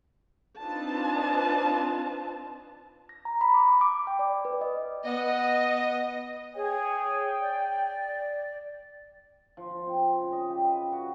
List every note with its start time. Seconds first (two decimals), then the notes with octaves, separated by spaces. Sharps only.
0.60 C4 D4 D#4 F4 B4 A5
3.09 A#6
3.25 A#5
3.41 B5
3.54 D6
3.81 D6
4.07 G5
4.19 D5
4.45 B4
4.61 D#5
5.06 B3 D#5
6.55 G#4 C#5 G5
7.40 D5
9.57 F3
9.70 F4
9.86 C4
10.04 B5
10.20 C#3
10.32 D#5
10.50 G4
10.65 B4
10.92 F#4